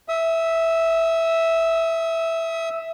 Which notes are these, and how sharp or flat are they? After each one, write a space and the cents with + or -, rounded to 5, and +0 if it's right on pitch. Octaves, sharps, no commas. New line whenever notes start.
E5 +0 D#6 +35